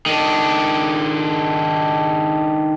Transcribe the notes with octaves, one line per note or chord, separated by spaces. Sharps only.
D#3 D4